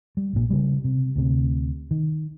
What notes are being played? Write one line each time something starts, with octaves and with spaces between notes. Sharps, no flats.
G3
A#1 A#2
C#3 G3
C3
D2 C3
D#3